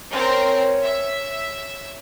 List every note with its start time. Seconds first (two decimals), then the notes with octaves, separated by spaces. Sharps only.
0.13 C4 C#4 A#4
0.84 E5